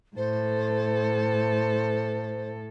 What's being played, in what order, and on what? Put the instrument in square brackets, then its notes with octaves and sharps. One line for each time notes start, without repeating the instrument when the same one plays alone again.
[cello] A2 A4 [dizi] C5